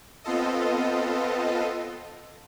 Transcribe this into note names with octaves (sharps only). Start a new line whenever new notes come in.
B3 C4 F4 A4 D#5